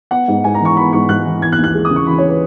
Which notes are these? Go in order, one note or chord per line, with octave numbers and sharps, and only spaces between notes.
B3 F#5
G#2
G#2 G#5
A#5
E3 C#6
B3 B5
G#2 C#6
G#2 F#6
E3
E3 G#6
F#6
D#2
F#6
G#3
D#6
C#3
C#6
E3 B5
C#5
B4